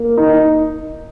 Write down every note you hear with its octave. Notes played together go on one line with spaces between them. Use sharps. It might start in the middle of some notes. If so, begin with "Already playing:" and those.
Already playing: A#3
D#4